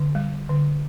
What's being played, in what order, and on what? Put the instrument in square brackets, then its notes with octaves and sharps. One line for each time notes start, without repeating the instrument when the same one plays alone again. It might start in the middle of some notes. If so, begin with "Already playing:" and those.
Already playing: [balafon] D3
G3
D3